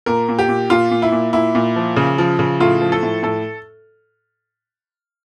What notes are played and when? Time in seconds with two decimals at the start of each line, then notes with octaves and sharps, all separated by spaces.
0.06 A#2 A#4
0.29 A#2
0.39 G4
0.49 A#2
0.70 A#2 F4
0.91 A#2
1.02 E4
1.12 A#2
1.33 A#2 E4
1.55 A#2
1.76 F3
1.96 C#3
2.18 F3
2.39 C#3
2.60 A2 F4
2.81 F3
2.92 A4
3.03 A2
3.23 A2 A4